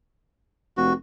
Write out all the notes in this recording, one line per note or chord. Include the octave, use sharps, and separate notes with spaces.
F1 F#4